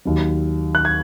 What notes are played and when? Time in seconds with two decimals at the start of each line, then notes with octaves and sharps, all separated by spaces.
0.05 D#2 D#3 F#3
0.75 F#6
0.85 G#6